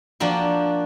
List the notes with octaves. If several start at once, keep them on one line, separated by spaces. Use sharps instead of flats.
F3 A#3 D4 F#4 G5